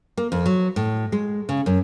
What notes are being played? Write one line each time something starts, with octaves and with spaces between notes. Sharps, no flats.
A#3
F2
F#3
A2
G#3
C#3
F#2